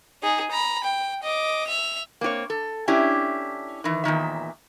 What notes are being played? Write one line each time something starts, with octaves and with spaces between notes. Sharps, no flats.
D#4 G#4
A#5 B5
G5
D#5 D6
E5 F7
A#3 C4 F4 C#5
A4
C#4 D4 E4 G4
D#3 E3
E2 A#2 D#3 E5